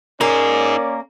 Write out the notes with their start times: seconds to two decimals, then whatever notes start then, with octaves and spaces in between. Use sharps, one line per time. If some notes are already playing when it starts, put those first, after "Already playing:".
0.21 A#3 C#4 D#4 G#4 C#5 D5